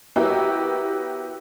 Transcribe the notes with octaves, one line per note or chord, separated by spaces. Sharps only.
F#3 B3 E4 F#4 G4 A#4